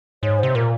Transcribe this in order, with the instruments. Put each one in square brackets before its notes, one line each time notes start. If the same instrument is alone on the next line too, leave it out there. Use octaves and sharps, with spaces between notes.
[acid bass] G#2 [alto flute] C#5
[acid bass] C3 [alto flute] C5
[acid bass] A#2 [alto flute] A#4